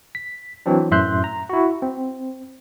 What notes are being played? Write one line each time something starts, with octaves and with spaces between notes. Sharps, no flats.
B6
E3 F#3 C4 D4
F#2 A2 E5 C6 F#6 G6
A#5
E4 F#4
C4